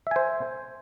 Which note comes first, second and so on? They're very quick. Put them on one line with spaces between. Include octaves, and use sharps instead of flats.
E5 G#5 C5